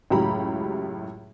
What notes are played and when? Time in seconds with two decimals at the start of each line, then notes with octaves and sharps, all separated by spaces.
0.10 C#2 F#2 A2 G4 A#5 B5